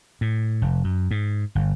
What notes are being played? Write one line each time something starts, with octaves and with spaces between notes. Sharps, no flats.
A2
F1
F#2
G#2
G1